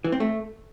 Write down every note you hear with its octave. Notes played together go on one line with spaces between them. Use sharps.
E3
C4
A3